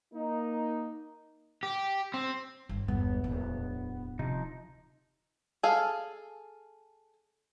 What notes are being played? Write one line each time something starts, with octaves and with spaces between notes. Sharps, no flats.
A#3 D#4
G4
C4
G1
G1 E2 B2 G#3 B3
D1
C3 F3 D#4
G#4 A4 F5